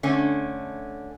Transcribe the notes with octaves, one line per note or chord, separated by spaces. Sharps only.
D3 A3 C#4